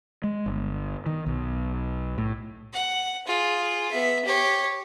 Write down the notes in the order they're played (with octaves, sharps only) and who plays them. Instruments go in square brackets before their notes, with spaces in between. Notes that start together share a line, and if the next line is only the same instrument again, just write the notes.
[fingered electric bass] G#3
G1
D#3
B1
A2
[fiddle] F#5
F4 G#4
B3 E5
G4 C#5